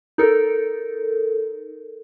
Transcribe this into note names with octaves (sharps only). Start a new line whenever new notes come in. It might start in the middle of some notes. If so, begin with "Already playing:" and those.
D#4 A4 A#4